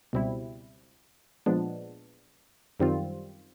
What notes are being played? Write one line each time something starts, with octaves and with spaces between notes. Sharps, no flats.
C#2 B2 G3 C4 E4
A#2 F3 G#3 B3 D4
F#2 D#3 G3 C4 F4